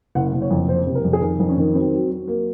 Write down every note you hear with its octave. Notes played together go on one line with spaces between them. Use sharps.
F#1 F#5
F#1
C#5
F2
F#1 C5
C3
A#4
F2
G#4
D#3 A#4
F2
C#4
D#3
F#3 C4
F#3
F#3
A#3